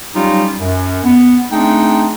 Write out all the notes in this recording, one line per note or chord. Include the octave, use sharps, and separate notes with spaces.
F#3 G3 C#4 D#4 F4 G4
F#2
B3
A3 C4 D4 D#4 G#4 G5